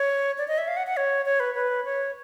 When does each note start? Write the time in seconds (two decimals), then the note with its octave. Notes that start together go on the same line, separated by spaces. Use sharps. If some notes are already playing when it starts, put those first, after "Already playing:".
Already playing: C#5
0.38 D5
0.48 D#5
0.58 E5
0.68 F5
0.77 F#5
0.87 F#5
0.97 C#5
1.26 C#5
1.40 B4
1.54 B4
1.85 C#5